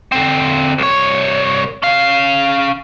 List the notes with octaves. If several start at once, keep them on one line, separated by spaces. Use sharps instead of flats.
D3 C4
C2 C#5
C#4 F5